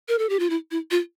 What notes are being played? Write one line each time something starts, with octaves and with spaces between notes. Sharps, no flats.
A#4
A4
G4
F4
E4
E4
F4